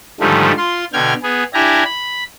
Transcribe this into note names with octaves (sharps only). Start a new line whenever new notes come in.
G#2 D3 D#3 F3 G3 A3
F4 C6
B2 D3 G5 F6 G#6
B3 G#4
D4 E4 G4 G#5 A#5
B5